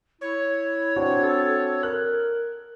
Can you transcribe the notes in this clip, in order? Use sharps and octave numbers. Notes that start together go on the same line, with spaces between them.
E4 C#5
C4 D4 F#4
A4
A#4 F#6